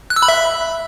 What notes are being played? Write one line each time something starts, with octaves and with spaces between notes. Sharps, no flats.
F#6
E6
B5
E5